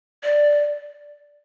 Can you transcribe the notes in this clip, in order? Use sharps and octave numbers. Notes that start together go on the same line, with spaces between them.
D5